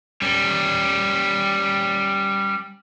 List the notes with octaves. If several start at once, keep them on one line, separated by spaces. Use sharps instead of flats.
G3 C#4